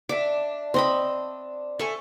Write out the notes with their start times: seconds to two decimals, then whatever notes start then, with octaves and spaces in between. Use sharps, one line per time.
0.09 D4 E5 D6
0.74 C4 D#5 B5
1.79 A3 A4 G#5 C#6